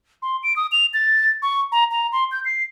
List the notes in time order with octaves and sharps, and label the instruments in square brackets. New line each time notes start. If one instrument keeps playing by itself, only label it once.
[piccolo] C6
D7
D#6
F7
A6
C#6
A#5
A#5
C6
G6
C7